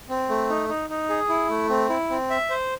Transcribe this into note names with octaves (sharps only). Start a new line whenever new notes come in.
C4
A3
D#4
D#4
D#4
G#4
E4
A3
C4
E4
C4
E5
C5